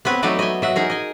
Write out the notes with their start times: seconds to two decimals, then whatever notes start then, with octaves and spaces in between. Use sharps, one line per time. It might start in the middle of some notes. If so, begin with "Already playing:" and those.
0.05 B3 C4 B4 C#5
0.23 F#3 A3 B3 D#4 B4 D5
0.39 D#5 E5 G#5
0.62 F#3 E5 F#5
0.76 D#4 G#4 A#4
0.90 D#5 G#5